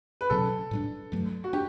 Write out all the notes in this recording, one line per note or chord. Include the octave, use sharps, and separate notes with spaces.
B4
B2 F#3 C#4 A4
A2 G3 D4
G2 F#3 A3
F#4
D4 G4